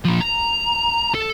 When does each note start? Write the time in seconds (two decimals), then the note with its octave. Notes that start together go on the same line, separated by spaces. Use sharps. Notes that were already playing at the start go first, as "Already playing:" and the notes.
0.05 A#2 F3
0.21 A#5
1.15 A4